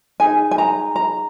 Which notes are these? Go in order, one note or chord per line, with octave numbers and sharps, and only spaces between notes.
D#4 G#4 G#5
G#5
A#5
A#5